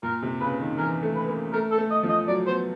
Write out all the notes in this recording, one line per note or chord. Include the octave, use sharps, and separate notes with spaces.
A#2 A#4
C3
C#3 B4
D#3
E3 A#4
A3
B4
A#3
A3 A#4
A4
A3
D#5
F3
D#5
F#3 D5
B3 C5